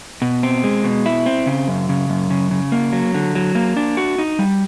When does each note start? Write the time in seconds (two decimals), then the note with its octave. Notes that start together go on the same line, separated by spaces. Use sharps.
0.22 B2
0.43 C4
0.64 G#3
0.84 B2
1.06 E4
1.26 C4
1.46 C#3
1.68 F#2
1.89 C#3
2.09 F#2
2.30 C#3
2.51 C#3
2.72 A#3
2.93 F#3
3.14 D3
3.35 F#3
3.55 A#3
3.77 D4
3.97 F#4
4.18 D#4
4.39 G3